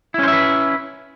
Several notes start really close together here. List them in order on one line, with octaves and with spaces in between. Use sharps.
E4 C#4 C5 E5 B4